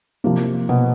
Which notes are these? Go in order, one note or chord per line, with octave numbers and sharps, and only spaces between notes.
C3 F3 A#3
B2 B3